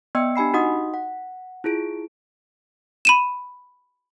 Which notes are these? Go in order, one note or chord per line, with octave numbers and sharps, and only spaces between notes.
B3 D5 D#5 G5 E6 C#7
D4 G4 G#5 B5 C7
D#4 F#4 D#5 F#5 C6 D#6
F#5
E4 F4 G#4 D7
B5 D#7 E7